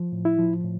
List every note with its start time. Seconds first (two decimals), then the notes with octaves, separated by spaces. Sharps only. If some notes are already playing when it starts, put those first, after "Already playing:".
Already playing: F3
0.12 A2
0.25 E4
0.38 F3
0.64 A2